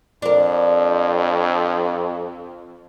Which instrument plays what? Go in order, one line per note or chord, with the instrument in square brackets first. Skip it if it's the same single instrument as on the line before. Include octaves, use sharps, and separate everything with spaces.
[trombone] F2 [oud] D4 A#4